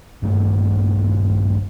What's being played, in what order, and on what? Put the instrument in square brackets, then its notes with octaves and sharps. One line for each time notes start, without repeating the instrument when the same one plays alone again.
[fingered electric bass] D#1 G2 A3